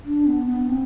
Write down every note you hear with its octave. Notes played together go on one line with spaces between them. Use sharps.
D4
B3
B3
C4